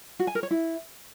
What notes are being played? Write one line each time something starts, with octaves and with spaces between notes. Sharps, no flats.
F#4
G#5
A#4
C#5
E4